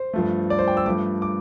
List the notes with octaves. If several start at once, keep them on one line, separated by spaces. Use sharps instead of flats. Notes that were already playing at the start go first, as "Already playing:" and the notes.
Already playing: C5
G2 F3 A3
D5
C5
G5
E6
G2 F3 A3 D6
D6